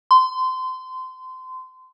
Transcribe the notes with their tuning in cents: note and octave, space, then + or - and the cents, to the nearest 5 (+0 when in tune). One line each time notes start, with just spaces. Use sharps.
C6 -25